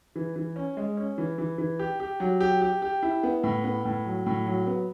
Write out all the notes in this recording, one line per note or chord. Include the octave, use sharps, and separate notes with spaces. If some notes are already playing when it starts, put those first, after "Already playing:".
E3
E3
C#4
G#3
C#4
E3
E3
E3
G4
G4
F#3
G4
G4
G4
E4
B3
A2
B3
A2
F#3
A2
F#3
B3